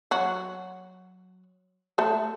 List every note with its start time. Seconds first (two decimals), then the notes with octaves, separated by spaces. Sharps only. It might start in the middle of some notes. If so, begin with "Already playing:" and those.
0.11 F#3 F#4
1.98 A3 A4